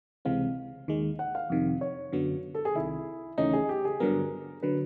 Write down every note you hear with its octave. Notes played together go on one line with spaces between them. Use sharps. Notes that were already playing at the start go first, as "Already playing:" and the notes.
C#2 C3 E3 G#3 C4 F5
D#2 D#3 G#3
F#5
F5
F2 C3 D#3
C#5
F#2 D3 F#3 B3
A4
G#4
C2 C3 D#3 E4
D#2 C#3 E3 A3 C#4 D#4
G#4
G4
G#4
G2 D3 F#3 B3 A#4
D3 F#3 B4